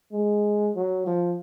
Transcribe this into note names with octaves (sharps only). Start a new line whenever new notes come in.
G#3
F#3
F3